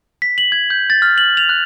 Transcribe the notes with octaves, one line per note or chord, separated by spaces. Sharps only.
B6
F#7
G#6
G6
A6
F6
F#7
F7
F#6